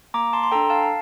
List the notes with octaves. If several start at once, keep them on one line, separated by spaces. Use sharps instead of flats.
A#3 A#5 D6
A5 C6
C6
D4 A4 G5 A#5
F5 A5